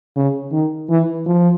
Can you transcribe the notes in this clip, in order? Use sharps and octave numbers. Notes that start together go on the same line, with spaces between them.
C#3
D#3
E3
F3